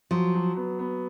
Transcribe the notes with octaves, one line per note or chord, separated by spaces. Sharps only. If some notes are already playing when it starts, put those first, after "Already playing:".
F3 F#3
F#3
B3
B3